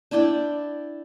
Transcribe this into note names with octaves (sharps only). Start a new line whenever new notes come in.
D4 E4 D5 G5